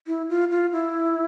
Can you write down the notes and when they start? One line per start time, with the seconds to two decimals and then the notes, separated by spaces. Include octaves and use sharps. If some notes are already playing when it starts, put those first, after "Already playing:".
0.07 E4
0.29 F4
0.51 F4
0.72 E4